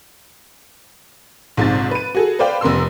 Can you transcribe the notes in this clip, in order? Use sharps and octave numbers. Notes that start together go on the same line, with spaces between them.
A#1 G#2 C3 A6
B4 D#7
F#4 G#4 A4
B4 C5 D5 F5 G5 B5
F1 B3 A#4 C6 E6